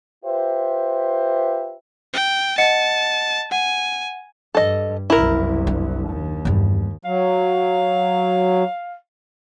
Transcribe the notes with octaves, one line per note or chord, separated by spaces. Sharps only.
F4 G4 B4 C5 E5
G5
D#5 F#5 A5 C#7
F#5 G#5
G2 A4 D#5
F#1 C2 E4 A#4
D4
D#2
E2 G2
F#3 F5